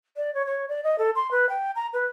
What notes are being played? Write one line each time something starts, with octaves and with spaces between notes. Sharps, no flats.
D5
C#5
C#5
D5
D#5
A4
C6
B4
G5
A#5
B4